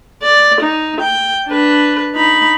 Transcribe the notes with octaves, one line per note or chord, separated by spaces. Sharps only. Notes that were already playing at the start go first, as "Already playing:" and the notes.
D5
D#4
G5
D4 B4
D#4 B5